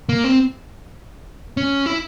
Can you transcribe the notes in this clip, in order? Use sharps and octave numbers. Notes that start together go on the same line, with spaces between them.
A#3
C4
C#4
E4